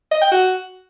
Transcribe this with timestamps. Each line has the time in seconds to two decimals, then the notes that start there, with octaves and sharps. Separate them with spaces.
0.11 D#5
0.22 G5
0.32 F#4